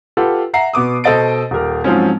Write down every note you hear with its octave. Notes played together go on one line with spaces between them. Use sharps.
F4 G4 A4 B4 F#5
E5 F#5 A#5 C7
B2 B3 D6 D#6
B2 A4 C5 D#5 A6 D7
D#1 G4 A#4
G#2 F3 F#3 G#3 C4 C#4